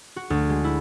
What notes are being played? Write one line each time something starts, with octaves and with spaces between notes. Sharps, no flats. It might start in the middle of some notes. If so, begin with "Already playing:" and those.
F#4
D2
G#3
E4